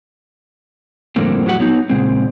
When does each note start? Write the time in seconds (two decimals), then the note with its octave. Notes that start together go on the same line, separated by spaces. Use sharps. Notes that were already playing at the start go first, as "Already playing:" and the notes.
1.16 F2 A2 D3 G3 A#3 C4
1.46 A2 F#3 F#4 G4 F#5
1.60 F#3 B3 D#4
1.90 A#2 C#3 G#3 C4